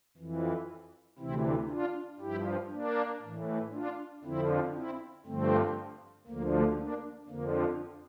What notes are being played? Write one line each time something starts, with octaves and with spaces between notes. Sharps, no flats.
F2 E3
D2 C3 E3 C4 E4
D4 F4
G2 F3 E4 G4
A#3 D4
A2 E3
D4 F4
F2 D3 F3 C4 E4
C4 E4
G2 D3 F3 A3 C4
D2 D3 F3 A#3
A#3 D4
F2 D3 F3 A#3